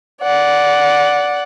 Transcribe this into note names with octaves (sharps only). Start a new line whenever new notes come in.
D5 F#5